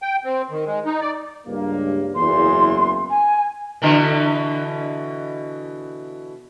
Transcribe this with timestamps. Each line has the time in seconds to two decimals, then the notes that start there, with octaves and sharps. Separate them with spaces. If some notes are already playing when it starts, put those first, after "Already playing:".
0.02 G5
0.25 C4
0.51 D#3
0.66 G#3
0.85 D#4
1.01 D5
1.47 C#2 G2 A#3
2.15 F#1 E2 C6
3.10 G#5
3.82 B2 D3 E3